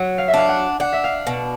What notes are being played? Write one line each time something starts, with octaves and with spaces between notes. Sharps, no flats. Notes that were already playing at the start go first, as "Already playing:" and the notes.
Already playing: F#3
F5
E5
D4 F5
F#5
D4 F#5
E5
F5
B2